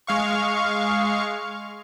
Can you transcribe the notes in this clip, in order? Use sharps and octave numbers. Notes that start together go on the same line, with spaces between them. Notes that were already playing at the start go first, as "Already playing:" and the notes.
G#3 F5 C#6